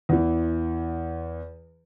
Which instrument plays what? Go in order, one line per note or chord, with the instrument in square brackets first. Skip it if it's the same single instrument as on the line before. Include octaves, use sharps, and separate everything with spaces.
[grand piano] E2 E3